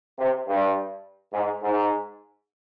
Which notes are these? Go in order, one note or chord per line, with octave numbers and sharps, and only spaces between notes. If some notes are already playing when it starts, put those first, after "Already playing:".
C3
G2
G#2
G#2